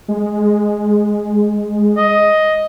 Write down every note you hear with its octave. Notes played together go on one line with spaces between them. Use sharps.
G#3
D#5